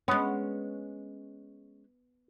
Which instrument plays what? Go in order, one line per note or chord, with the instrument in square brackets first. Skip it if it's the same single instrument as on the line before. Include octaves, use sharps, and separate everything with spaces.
[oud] G#3 C#4 [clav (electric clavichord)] B3